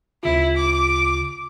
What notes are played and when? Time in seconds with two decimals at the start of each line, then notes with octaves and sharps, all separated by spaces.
0.23 D2 C#3 E4 F4
0.56 D6